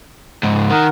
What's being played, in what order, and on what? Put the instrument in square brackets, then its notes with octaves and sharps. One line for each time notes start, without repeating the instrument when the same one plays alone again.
[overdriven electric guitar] C#2 G#2
[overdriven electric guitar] D#3 [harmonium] A#4 F#5